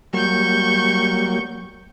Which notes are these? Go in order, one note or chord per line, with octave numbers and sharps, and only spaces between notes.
F#3 G3 A#3 C#6 G6